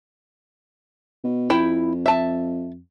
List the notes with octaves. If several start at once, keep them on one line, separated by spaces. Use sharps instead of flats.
B2
F2 E4 G5
E5 A5